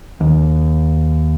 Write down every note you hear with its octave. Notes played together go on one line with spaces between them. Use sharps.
D#2